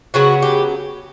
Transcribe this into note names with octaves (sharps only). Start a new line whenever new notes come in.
C#3 F#3 B3 F#4
G4